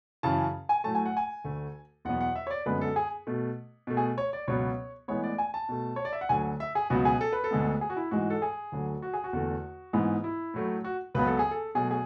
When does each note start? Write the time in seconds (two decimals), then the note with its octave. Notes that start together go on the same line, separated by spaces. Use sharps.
0.23 F#2 C#3 E3 A5
0.69 G#5
0.84 A2 F#3 A3 A5
0.95 G#5
1.06 F#5
1.17 G#5
1.44 D2 D3 A3
2.05 E2 B2 F#3 B3 F#5
2.21 F#5
2.36 E5
2.47 C#5
2.50 D5
2.66 F#2 D3 G#3 B3 B4
2.81 A4
2.96 G#4
3.27 B2 A3
3.87 B2 A3
3.97 G#4
4.18 C#5
4.33 D5
4.48 C#2 B2 F#3 B3 C#5
5.08 A2 E3 G#3 B3 C#5
5.24 D5
5.38 G#5
5.54 A5
5.69 B2 A3
5.96 C#5
6.05 D5
6.13 E5
6.21 F#5
6.29 D2 D3 F#3 G#5
6.60 E5
6.75 G#4
6.90 C#2 B2 F#3 B3 F#4
7.05 G#4
7.21 A4
7.33 B4
7.44 A4
7.51 D2 D3 G#3 B3
7.81 G#4
7.90 F#4
7.97 E4
8.11 G#2 E3 G#3 F#4
8.30 A4
8.42 G#4
8.72 D2 D3 F#3
9.02 F#4
9.14 G#4
9.24 F#4
9.33 E2 D3 A3
9.93 G#2 E3 G#3 B3
10.24 E4
10.54 A2 F#3 A3
10.84 F#4
11.15 C#2 C#3 F#3 B3 B4
11.27 A4
11.39 G#4
11.51 A4
11.75 B2 F#3 A3 G#4
11.91 G#4